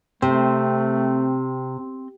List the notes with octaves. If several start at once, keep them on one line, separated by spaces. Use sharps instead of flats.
C3 A3 C4